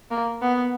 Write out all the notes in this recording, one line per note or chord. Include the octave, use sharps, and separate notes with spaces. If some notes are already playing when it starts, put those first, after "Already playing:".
A#3
B3